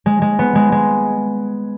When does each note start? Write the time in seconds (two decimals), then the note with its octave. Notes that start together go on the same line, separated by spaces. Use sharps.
0.06 G#3
0.22 G#3
0.39 B3
0.55 G#3
0.72 G#3